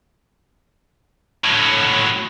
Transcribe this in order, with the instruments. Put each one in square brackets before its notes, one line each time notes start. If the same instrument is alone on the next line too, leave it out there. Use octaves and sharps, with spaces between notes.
[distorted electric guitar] A2 F#3